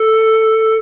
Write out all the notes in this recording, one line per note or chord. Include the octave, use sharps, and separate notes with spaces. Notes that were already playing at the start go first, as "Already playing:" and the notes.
Already playing: A4